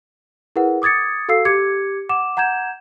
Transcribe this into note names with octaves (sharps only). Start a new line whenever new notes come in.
E4 G#4 A#4 B4 F#5
D6 D#6 G#6 A6 C#7
F#4 A4 F5 E6 C7
G4 D6 G#6 C#7
F#5 D6 E7
F#5 A#5 G6 G#6 E7